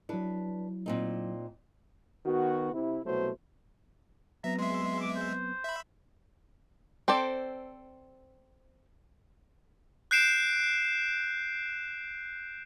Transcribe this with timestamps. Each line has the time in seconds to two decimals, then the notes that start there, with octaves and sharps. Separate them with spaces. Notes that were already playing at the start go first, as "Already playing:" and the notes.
0.09 F#3 D4 E4 B4
0.86 A#2 C4 D#4
2.26 D#3 B3 F#4
2.73 C3 E4
3.04 C2 B2 F#3 A3 C5
4.44 F#3 B3 C4 E5 A#5
4.59 G#3 E5 C6
5.01 D6
5.15 C5
5.64 E5 B5
7.08 C4 A4 C5 D5
10.11 F#6 G6 C7 D7 E7